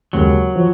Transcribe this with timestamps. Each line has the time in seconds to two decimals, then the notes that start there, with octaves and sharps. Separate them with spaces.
0.13 D#2 C#3 F#3 G#3
0.55 F3